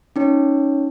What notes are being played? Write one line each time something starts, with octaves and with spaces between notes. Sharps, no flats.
C#4 D#4 C#5